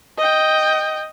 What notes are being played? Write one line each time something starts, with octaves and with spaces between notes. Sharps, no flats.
D#5 G5